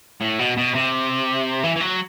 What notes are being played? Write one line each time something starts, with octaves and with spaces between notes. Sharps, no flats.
A2
B2
B2
C3
E3
E3
F#3